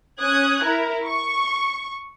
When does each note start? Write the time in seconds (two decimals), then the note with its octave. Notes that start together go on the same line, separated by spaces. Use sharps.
0.21 C#4 D#6 F#6 G#6
0.64 E4 A#4
1.05 C#6